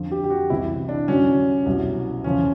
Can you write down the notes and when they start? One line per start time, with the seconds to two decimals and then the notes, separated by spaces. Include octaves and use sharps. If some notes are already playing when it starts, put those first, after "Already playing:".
Already playing: F2 D3 F3
0.11 G4
0.24 G4
0.30 F#4
0.50 C2 C3 E3 E4
0.89 D4
1.08 F#2 D3 F#3 C#4
1.66 C2 B2 F#3
2.24 E2 C#3 F3 C#4